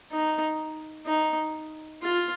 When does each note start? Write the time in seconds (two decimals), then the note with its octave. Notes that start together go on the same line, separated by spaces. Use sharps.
0.12 D#4
1.07 D#4
2.02 F4